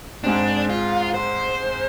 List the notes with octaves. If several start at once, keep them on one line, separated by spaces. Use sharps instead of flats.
G#2 G#3 C4 D4
F4
C5